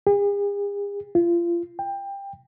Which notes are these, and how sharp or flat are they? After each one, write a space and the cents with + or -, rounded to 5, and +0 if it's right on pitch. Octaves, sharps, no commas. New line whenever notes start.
G#4 -45
F4 -30
G5 +20